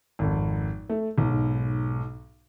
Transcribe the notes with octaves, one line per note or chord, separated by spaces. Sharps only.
G#1 F2
A3
B1 G#2